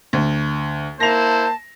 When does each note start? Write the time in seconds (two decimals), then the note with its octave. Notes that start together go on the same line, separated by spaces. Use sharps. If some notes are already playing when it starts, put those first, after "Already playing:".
0.13 D2
1.00 A#3 E4 C5 A5 A#6 F7